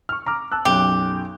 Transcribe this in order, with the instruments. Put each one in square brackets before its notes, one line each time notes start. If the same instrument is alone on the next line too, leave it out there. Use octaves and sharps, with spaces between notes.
[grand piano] C#6 F6
A#5 D6 F6
A5 E6 F#6
[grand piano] B1 F#2 [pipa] G4